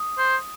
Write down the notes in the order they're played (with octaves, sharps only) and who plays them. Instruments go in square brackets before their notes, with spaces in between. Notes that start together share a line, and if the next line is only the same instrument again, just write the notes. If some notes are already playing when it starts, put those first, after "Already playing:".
Already playing: [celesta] D#6
[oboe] C5